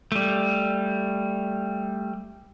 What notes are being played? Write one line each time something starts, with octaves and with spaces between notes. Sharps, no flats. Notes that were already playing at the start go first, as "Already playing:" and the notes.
G3 A3